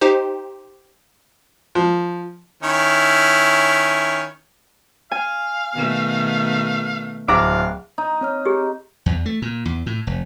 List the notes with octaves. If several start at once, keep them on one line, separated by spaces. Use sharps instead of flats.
D#4 G4 C5
F3
D#3 C#4 E4
F5 G#5
B2 D#3 A3
D1 F5 F#5 A#5 D6
D#4
C4 C#5 F6
G4 G#4
E2
A3
A#2
E2
A2
F1